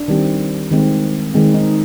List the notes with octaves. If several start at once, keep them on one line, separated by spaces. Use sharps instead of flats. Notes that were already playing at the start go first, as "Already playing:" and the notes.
Already playing: D4
D#3 G3 C4
D#3 G#3 C4
D#3 G#3 C4
D#4